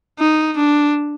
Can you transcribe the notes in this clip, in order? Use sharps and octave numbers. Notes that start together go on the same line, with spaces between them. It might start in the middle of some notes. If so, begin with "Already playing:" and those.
D#4
D4